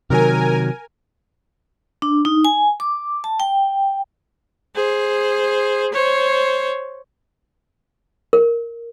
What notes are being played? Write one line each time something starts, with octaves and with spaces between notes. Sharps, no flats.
C3 D#3 F#3 A#4 G#5
D4
D#4
G#5
D6
A5
G5
G#4 C5
C5 C#5
A#4